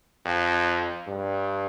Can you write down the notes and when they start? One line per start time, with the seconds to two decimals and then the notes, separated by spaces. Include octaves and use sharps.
0.25 F2
1.07 G2